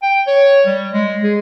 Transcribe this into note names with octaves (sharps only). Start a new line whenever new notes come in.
G5
C#5
G3
G#3
G#4